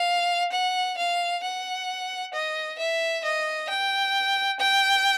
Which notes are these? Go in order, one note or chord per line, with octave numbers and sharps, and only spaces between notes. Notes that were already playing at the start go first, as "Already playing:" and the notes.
Already playing: F5
F#5
F5
F#5
D#5
E5
D#5
G5
G5